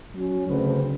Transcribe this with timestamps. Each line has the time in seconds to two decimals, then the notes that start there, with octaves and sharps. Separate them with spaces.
0.16 F#3 C#4
0.48 D2 C#3 C4 B4